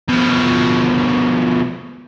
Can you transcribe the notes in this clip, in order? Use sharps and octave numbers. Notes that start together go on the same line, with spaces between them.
B2 F3